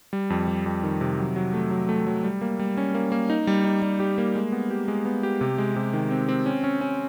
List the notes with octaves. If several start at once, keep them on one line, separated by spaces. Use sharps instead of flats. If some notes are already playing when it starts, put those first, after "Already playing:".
G3
F2
G3
F2
D#3
C3
F#3
F#3
A3
F#3
A3
F#3
G3
A#3
G3
C#4
A#3
A#3
D#4
G3
D#4
G3
G4
A#3
G#3
B3
G4
G#3
B3
G4
C3
G#3
C3
D#3
C4
C4
C#4
C#4
C#4